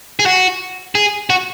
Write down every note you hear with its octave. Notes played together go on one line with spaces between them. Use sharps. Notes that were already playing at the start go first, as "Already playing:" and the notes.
G#4
F#4
G#4
F#4